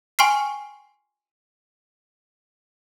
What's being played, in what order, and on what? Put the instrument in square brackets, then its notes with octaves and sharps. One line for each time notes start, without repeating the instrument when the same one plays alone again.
[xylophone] G5 G#5 C6 C#6 F6 C7